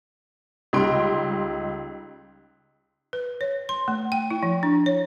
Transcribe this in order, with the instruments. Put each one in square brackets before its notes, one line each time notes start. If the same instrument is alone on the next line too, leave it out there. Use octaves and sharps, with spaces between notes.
[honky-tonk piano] C#2 G3 D#4 C6 D7
[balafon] B4
C#5
C6
A3
G5
E4
F3
D4
C#5